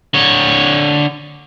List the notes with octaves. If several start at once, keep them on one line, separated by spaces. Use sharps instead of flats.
D3 C#5